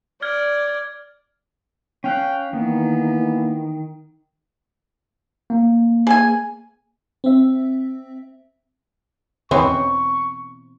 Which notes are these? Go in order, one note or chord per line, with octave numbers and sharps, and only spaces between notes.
D5 F6 G#6
C#4 F5 G5 F#6
D#3 E3 A#3 B3
A#3
G#4 G#5
C4 E5
E2 B2 E3 C4 C#4 C#6